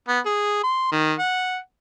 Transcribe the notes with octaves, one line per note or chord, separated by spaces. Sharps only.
B3
G#4
C6
D#3
F#5